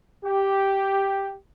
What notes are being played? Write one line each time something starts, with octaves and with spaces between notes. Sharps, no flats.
G4